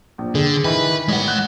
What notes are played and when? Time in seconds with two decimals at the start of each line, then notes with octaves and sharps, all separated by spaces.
0.18 A#1
0.35 D3 G#4
0.64 D#3 E3 B4
1.08 A1 G#3 F#5
1.28 F#6 G6